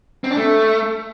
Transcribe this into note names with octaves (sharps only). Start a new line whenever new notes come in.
C4
D4
A3